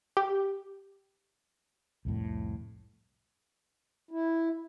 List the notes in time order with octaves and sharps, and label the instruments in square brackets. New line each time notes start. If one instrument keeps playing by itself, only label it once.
[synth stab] G4
[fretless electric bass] C2 F2 A2
[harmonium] E4